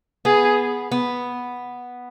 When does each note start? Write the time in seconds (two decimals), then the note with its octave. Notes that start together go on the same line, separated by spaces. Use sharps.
0.25 B3 G#4
0.92 B3